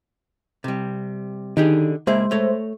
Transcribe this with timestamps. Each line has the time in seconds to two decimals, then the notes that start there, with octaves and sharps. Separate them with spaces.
0.64 C3 G3
1.57 D3 D#3 D#4 G4 G#4
2.07 C#2 G#3 A#3 G#4 C5 E5
2.31 A3 C#5